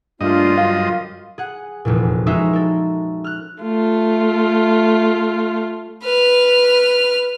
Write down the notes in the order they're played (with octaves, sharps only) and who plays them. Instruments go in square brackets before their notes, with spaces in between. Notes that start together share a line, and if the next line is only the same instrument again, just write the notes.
[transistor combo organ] G2 D#5 [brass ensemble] A3 A#3 D4 [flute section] F4
[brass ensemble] F#2 D3 F#3 [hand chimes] F5
[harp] G#4 F#5
F1 E2 A#2
G#3 C#4 D#4 F#4 C5 E5
A4 A#4
F6 F#6
[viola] A3 F4
[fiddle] B4 F6